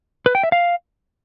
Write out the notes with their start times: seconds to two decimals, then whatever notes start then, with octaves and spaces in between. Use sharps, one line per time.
0.26 B4
0.35 G5
0.43 E5
0.52 F5